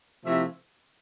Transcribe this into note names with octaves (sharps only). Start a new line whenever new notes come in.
C3 F3 A3 E4 E5